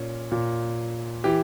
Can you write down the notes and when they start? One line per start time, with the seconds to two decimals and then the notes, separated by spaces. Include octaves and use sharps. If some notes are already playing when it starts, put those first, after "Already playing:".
Already playing: A#2 C#4
0.32 A#2
1.24 E3 G4